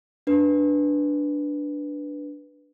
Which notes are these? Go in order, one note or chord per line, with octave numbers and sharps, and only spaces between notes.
D4 B4